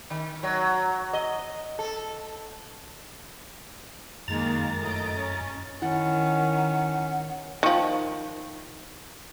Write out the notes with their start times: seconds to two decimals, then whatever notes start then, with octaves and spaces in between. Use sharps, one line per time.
0.10 D#3
0.43 F#3
1.13 D#5
1.79 A4
4.28 F#2 D#3 G#3 A#3 A#5 A6
4.79 A2 D#5 D7
5.15 C#4
5.82 D#3 C#4 E4 F#5
7.63 D#3 F3